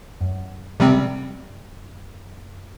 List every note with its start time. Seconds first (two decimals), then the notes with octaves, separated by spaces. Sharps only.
0.21 F#2
0.80 C3 G3 C4